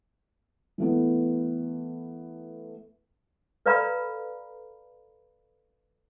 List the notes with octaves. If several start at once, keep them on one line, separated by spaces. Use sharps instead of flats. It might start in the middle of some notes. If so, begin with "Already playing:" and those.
E3 A3 B3
A4 B4 D5 F5 A#5 B5